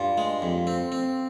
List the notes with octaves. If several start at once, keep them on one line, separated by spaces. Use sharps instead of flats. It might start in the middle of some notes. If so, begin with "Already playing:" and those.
Already playing: G2 F4
G#3
F2
C4
C4